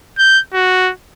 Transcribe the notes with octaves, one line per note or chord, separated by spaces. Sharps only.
G6
F#4